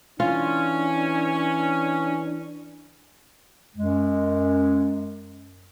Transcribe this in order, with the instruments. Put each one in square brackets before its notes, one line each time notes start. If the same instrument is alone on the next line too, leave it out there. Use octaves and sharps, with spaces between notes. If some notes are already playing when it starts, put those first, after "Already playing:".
[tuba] E3 [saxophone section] C#4 [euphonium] D4 [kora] F4
[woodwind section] F#2 G#3